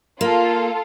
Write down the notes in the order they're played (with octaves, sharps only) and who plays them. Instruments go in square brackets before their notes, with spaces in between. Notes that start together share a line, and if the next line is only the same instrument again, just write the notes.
[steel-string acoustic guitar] A#3 [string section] F4 A4